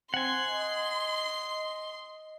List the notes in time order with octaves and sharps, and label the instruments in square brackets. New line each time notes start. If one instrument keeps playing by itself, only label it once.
[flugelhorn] C4 [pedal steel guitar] F#5 G#5 [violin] C6
[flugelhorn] D#5